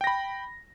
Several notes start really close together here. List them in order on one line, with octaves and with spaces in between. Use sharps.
G5 A#6 B5